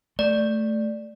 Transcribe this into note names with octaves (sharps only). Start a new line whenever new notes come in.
A3 D5